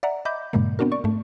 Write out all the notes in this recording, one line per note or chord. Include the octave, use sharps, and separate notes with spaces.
D5 E5 F#5 A#5
D#5 E5 B5 D6 G6
G2 A#2 C#3 G#3 A#3
B3 C4 D4 F#4 A#4
D5 C#6
G#2 A3